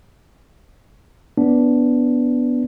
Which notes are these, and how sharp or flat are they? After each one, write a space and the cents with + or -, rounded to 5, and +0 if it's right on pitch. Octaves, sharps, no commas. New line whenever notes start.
B3 +0 D4 -10